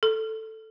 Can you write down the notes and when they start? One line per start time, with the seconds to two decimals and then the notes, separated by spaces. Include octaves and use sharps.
0.03 A4